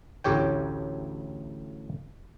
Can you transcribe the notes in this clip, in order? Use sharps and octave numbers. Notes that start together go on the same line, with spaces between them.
A1 D2 A2 G4 C#5 G5